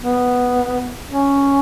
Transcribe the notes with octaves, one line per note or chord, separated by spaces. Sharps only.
B3
C#4